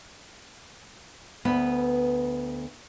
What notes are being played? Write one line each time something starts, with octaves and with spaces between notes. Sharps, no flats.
D2 B3 B4